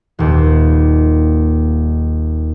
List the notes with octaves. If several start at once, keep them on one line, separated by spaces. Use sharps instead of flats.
D#1 D#2